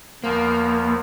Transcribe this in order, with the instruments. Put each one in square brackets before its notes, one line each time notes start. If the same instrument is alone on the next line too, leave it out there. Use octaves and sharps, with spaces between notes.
[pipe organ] E2 F3 [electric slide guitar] A#3